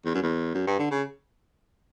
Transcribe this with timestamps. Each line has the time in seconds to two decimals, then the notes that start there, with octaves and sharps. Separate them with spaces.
0.05 E2
0.14 F#2
0.22 E2
0.54 F#2
0.67 G2
0.79 D3
0.91 C#3